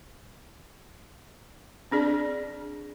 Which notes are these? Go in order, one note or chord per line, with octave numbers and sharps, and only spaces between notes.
C4 D4 G#4 D5